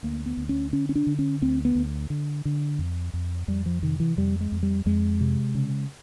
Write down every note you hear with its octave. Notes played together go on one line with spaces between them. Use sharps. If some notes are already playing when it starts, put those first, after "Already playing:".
D2 A#3
B3
D2
C#4
D3 C#4
C#4
D4
D3
C#4
D2 C4
B3
D2
D3
D3
F2
F2
F2 G3
F3
C3 D#3
E3
F2 G3
G#3
F2
G3
F2 G#3
C3
C#3